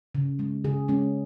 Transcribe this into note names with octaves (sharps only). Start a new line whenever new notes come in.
C#3
G#3
C#3 G#4
G#3 C#4